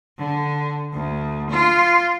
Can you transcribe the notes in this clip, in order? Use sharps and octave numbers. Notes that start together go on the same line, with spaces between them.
D3
D2
F4